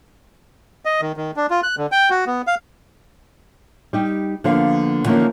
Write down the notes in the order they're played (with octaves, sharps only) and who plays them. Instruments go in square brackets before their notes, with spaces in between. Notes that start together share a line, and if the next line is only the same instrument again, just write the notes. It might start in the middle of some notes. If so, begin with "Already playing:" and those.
[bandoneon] D#5
D#3
D#3
D4
F4
F#6
D3
G5
F#4
B3
F5
[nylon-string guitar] G3 D#4 G4
D3 F3 A#3 B3 F5
D3 E3 F3 A#3 C#4 D#4